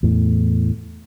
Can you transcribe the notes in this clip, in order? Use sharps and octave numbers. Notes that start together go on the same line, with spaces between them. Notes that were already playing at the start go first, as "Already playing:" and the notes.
E2 A2